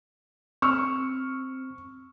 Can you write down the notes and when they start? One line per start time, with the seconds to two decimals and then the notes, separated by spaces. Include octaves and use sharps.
0.62 C4 C#6 E6 F6